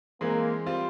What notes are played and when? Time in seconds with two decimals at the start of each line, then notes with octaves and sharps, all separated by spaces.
0.21 E3 G#3 A#3 C4
0.66 G3 C4 F4